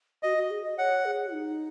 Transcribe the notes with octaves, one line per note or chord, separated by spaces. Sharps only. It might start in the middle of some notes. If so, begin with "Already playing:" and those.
F#4 D#5
F#4
G#4
D#5
C#5 F#5
G#4
D#4